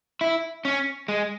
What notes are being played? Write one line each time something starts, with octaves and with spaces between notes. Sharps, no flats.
E4
C#4
G#3